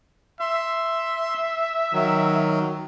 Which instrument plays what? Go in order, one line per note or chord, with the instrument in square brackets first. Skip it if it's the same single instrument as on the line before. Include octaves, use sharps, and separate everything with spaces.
[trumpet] E5 [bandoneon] C6
[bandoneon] D#3 F#3